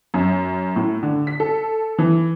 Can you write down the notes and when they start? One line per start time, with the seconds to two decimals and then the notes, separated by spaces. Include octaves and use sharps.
0.14 F#2
0.76 A2
1.03 D3
1.27 B6
1.40 A4
1.98 E3